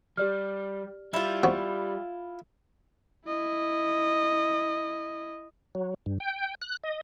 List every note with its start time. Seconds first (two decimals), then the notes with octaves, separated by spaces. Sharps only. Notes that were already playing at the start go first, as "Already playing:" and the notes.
0.17 G3 G4 D5 F6
1.13 G3 E4 F4
1.43 B3 C4 F#4
3.26 E4 D#5
5.75 F#3
6.06 G2
6.20 G5
6.62 F#6
6.84 D#5